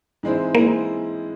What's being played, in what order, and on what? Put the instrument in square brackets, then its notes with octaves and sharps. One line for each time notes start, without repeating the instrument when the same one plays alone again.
[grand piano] G#2 E3 G#3 C4 E4
[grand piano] E3 G#3 C4 E4 [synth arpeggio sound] A#3